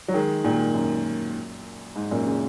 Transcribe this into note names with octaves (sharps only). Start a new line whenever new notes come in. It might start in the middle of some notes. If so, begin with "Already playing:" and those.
F#3
D#3 G#3
A#2 D#3
F#2
G#2
F#2 A#2
C#3